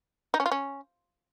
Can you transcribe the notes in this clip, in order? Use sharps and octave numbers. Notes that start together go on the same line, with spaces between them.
D#4
C#4
F4
C#4